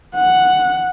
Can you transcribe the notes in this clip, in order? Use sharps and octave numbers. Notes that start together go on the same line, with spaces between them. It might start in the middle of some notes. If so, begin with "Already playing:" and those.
F#5